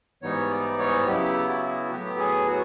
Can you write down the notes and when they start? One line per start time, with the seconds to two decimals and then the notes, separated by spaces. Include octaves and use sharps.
0.22 G#2 E3 G3 B3 D#4 C#5
0.51 D5
0.79 C#5
1.07 C#3 F#3 B3 E4 G4
1.49 F#4
1.90 A2 F#3 B3 G4
2.18 G#4
2.47 F#4